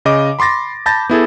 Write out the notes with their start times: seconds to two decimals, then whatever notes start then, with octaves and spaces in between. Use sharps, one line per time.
0.05 C#3 D#5 D6
0.39 B5 C6 D6 A6 A#6
0.86 A5 B5 G6 A6 A#6
1.10 B3 E4 G#4 A4